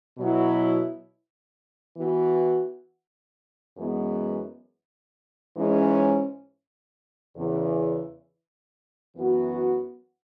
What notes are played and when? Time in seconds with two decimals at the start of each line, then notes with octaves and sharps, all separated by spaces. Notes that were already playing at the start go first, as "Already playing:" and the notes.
0.18 B2 F#3 E4
1.97 E3 B3 F#4
3.77 F#2 E3 G#3 B3
5.57 G#2 E3 G#3 C#4
7.36 E2 C#3 E3
9.16 F#2 E3 B3 F#4